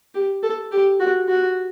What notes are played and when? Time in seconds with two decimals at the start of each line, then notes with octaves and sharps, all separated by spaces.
0.14 G4
0.43 A4
0.72 G4
1.00 F#4
1.28 F#4